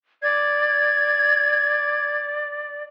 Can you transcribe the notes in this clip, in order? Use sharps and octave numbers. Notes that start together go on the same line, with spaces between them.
D5 G#6